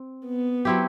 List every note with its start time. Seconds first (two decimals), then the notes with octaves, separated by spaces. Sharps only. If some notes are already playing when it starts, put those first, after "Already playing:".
Already playing: C4
0.26 B3
0.65 F#3 C4 E4 G4